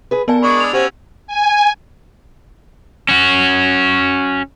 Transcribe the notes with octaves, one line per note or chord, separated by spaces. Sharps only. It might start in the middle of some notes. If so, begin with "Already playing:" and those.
G#4 B4
B3 A#4 D5 G#5 A5
G#3 D4 D5 B5 C#6
E6 F7
C#4 F#4 G4 C5
G#5
C#4 F#4